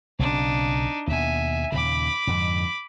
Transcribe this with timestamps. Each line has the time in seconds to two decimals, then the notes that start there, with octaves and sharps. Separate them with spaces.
0.19 B1 C#3 C4 D4 D#4
1.07 D#2 B2 E5 G#5
1.72 D#2 A#2 C#3 B5 D6
2.27 F2 G#2 D3